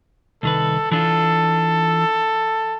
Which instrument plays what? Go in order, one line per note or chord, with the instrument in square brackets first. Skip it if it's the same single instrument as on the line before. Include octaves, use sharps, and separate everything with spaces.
[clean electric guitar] C2 D#3 B4 [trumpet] A4
[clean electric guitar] E3 D4 F4 [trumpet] A4